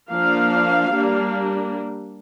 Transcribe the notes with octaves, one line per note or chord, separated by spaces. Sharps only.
F3 A#3 D4 F5
G3 A#3 D4